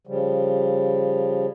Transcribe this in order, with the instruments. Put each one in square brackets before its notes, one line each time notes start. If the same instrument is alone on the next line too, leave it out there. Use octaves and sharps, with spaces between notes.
[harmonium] C#3 F3 G3